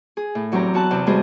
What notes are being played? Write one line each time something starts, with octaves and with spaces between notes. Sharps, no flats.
G#4
A2
E2 F#3 C4 G4 A#5
B3 F#4 A5 F#6
E2 C3 C4
G3 G#3 B3 F#4 G#4 C5